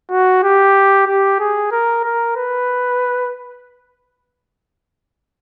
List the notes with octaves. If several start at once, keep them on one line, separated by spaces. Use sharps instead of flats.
F#4
G4
G4
G#4
A#4
A#4
B4